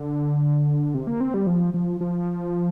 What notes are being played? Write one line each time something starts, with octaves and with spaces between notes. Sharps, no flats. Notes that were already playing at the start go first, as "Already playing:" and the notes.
Already playing: D3
C3
A#3
C4
G3
F3
F3
F3